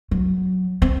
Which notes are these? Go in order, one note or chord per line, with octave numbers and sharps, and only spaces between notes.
F#3
C4